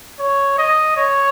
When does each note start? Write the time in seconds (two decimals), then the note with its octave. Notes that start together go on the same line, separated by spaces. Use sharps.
0.19 C#5
0.58 D#5
0.97 C#5